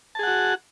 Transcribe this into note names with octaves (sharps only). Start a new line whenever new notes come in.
F#4 G#4 F#5 A5